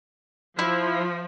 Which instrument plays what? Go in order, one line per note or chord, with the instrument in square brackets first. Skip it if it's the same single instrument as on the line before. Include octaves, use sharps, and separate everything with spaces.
[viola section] F3 [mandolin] E4